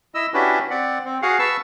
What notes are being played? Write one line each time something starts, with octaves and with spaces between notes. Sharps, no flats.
E4 D#5 E6
C#4 D4 E4 F#4 G4 B4
C4 D5 F#5
C4
F#4 G#4 F5 F#5
B4 A5 C#6 E6